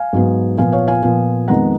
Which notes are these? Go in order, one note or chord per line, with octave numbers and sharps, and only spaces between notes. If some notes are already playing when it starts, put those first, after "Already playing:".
Already playing: F5 G#5
G#2 F#3 B3
A#2 F3 B3 F5 G#5
C#5 F5
F5 G#5
A#2 F3 B3
F2 D#3 G#3 B3 F#5 A#5